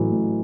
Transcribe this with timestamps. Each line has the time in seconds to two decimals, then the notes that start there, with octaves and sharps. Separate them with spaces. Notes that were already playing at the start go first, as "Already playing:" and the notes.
Already playing: A1 A2 E3 F#3
0.11 A1